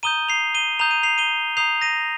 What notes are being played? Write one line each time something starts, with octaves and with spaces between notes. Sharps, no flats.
A#5 D#6 G6 D#7 G7
C7 F7
D#7 G7
A#5 D#6 G6 F7
D#7
C7 F7
D#7 G7
A#5 D#6 G6 C7 F7
A#6 D#7